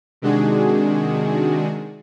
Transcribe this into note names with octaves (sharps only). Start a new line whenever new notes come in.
C3 D#3 G#3 D4 F#4 G#4